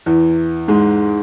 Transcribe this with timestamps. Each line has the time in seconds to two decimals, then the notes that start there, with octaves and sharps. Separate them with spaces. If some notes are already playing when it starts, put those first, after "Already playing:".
0.06 E2 E3
0.68 G#2 G#3